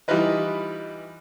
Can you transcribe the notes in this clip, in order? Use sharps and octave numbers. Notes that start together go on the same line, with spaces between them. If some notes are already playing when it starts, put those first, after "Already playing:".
E3 G3 D#4 F4 B4 D#5